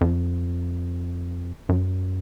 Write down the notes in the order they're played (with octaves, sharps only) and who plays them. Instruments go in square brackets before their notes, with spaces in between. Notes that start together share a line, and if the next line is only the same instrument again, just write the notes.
[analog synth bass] F2
F#2